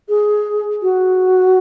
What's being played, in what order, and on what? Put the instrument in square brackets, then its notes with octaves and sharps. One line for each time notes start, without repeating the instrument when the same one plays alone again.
[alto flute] G#4
F#4